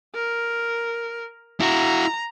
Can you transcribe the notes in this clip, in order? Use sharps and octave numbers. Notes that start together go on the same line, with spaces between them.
A#4
E4 F#4 A#5